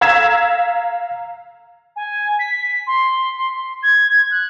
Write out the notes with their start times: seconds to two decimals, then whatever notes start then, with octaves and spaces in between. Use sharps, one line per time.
0.01 F5 A#5 E6 G#6 B6 E7
1.96 G#5
2.39 B6
2.87 C6
3.83 G#6
4.31 F#6